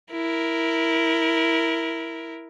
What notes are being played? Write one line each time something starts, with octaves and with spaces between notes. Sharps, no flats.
E4 A#4